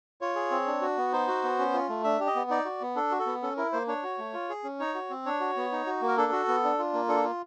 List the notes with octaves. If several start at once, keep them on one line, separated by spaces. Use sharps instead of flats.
F4 C#5
G#4
C4
D4
F#4
B3
D#4 C5
F#4
B3
C#4
F4
A3
D4 E5
G4
D#5
B3
D#4 D5
F#4
B3
D4 A4
F#4
A4
B3
C#4 A4
E4 A#4
A#3 C5
D4 C#5
F#4
A3
F4
G#4
C#4
D#4 C#5
F#4
C4
D4 C#5
F#4
B3
D#4
F#4
A#3
A#4
D4 A4
F#4
B3
D4
F4
A#3
D4 A4
F4